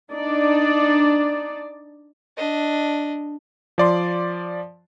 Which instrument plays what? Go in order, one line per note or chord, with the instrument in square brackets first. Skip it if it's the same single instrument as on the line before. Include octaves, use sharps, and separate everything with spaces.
[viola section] D4 D#4 D5
[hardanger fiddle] D4 D#5
[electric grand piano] F3 D5 C6